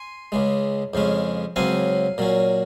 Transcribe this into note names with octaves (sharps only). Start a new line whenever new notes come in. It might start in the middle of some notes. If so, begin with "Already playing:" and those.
Already playing: G#5 C6
C#2 C#3 G#3
F2 C#3 G#3 C#4
C#2 C#3 F#3 C4 F5 G#5
A#2 F#3 C#4